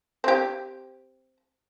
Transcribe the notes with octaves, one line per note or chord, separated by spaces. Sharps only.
C4 G4